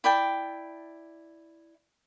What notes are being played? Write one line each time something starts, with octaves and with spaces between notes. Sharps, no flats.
E4 D5 G5 A5